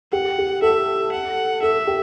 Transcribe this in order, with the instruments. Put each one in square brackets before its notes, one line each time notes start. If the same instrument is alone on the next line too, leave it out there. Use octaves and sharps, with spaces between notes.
[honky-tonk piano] G4 [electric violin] F#5
[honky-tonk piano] G4
[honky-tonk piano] A4 [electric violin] E5
[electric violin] F#5
[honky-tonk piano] A4 [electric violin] E5
[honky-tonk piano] G4